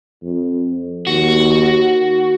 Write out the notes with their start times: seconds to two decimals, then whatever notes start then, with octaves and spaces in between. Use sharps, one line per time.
0.22 F2
1.07 D#2 F#4